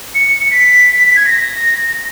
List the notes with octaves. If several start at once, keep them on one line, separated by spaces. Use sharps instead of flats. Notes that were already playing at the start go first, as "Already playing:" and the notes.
C#7
C#7
B6
G#6
A#6